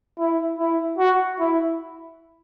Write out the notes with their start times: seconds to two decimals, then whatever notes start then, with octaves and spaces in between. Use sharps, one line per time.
0.18 E4
0.59 E4
0.98 F#4
1.40 E4